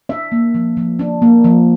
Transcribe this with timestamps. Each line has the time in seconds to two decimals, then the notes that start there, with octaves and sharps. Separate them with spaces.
0.09 D4 E5
0.32 A#3
0.54 F3
0.77 F3
0.99 D4
1.22 A#3
1.44 F3